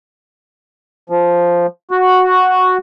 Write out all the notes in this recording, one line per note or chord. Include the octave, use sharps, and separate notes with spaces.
F3
F#4